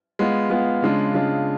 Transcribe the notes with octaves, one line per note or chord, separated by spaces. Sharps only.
G#3 B3 F4
G#3 B3 F4
C#3 G#3 D4 F4
C#3 G#3 D4 F4